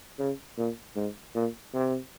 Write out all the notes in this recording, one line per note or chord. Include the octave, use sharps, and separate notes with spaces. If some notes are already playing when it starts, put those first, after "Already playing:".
C#3
A#2
G#2
A#2
C3